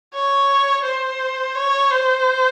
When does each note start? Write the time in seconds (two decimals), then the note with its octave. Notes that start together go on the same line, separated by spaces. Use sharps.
0.15 C#5
0.84 C5
1.55 C#5
1.90 C5